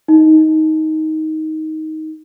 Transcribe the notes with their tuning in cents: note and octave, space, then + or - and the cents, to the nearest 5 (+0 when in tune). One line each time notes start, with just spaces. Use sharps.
D#4 +15